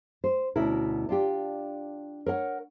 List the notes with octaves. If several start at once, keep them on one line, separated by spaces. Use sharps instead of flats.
C5
D2 B2 C#4 E4 A#4
D4 F4 G4
A#4 C#5 F#5